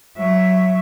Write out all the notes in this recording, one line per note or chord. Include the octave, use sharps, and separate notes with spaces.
F#3 E5